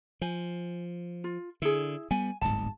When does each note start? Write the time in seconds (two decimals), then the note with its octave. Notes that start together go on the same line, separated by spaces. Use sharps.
0.21 F3 C5 G#5
1.24 F4
1.62 D3 E4 G#4
2.11 G3 B3 G#5
2.41 D1 G1 G#2 A5